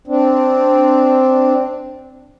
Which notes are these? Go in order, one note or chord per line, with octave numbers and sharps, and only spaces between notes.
C4 D4